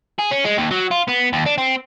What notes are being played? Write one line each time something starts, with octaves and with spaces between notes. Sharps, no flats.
G#4
C#4
G#3
D#2
F#3
F4
B3
D#2
D4
C4